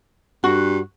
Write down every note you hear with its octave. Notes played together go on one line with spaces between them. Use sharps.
G2 F#4